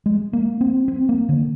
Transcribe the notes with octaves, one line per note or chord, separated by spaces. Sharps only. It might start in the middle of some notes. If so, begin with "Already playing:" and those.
G#3
A#3
C4
C4
A#3
D3